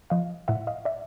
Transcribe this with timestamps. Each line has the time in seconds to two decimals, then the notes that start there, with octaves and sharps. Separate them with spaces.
0.10 F3 D#5 F5
0.48 A2 E5 F#5
0.67 D#5 F5
0.85 D5 E5